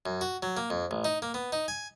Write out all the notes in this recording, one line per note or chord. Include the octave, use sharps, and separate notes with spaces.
F#2
F#4
F#3
A#3
F2
A1
D#4
A#3
B3
D#4
G#5